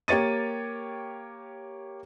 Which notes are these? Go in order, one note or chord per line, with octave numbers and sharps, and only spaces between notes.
A#3 G4 C#5 A6 D#7